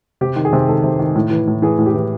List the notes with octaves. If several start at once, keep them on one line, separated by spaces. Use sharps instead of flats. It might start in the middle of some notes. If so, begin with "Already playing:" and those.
C3 G4
D#3
G#4
C3
D#3 A4
C3
D#3
A2
E3
A2
E3 G#4
A2
G4
E3